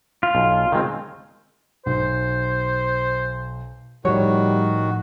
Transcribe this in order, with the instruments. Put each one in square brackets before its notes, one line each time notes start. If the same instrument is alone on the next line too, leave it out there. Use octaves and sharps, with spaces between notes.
[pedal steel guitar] F4
[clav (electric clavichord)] B1
D#3 G#3 C4
[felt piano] B1 [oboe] C5
[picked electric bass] A2 F3 [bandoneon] D#3 F#4 [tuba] G3 [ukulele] C#5